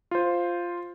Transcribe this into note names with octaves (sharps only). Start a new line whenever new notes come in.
F4 C5